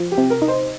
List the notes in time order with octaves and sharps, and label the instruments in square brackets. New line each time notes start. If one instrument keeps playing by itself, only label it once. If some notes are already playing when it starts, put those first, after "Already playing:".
Already playing: [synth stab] F3
[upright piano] G4
[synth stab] C3
[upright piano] A#4
[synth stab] D#4
[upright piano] C5